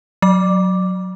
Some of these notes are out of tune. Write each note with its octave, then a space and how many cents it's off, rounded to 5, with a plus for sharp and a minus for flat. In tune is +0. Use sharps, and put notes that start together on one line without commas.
F#3 -5 D6 +0